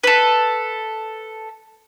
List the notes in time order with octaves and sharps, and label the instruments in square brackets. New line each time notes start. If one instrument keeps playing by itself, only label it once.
[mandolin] A4 B4